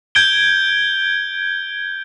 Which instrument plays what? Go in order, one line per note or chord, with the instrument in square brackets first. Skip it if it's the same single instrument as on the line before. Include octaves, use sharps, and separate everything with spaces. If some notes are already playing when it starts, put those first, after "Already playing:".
[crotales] G6 G#6 D7 G7